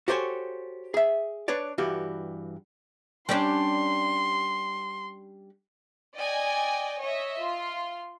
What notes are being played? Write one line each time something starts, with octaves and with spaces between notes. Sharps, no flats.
F#4 G4 A4 C5 C#5 G#5
G#4 E5
D4 B4 C#5 D5
G2 E3 F#4 G4
G3 C#4 D4 C6
D5 D#5 G5 G#5
C#5 D#5 E5
F4 C6